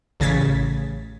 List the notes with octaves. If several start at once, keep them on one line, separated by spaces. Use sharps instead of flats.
A1 C#3 G#6 A6 B6